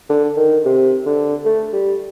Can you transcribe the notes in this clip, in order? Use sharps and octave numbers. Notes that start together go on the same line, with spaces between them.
D3
D#3
C3
D3
A3
G3